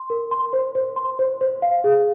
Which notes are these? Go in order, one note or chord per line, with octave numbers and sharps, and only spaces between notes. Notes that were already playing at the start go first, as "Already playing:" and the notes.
Already playing: C6
A#4
C6
C5
C5
C6
C5
C5
F5
G#4